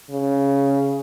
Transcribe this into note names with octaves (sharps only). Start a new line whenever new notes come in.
C#3